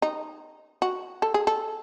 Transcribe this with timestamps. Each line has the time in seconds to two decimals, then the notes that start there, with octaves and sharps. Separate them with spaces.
0.02 D#4
0.82 F#4
1.22 A4
1.34 G#4
1.47 A4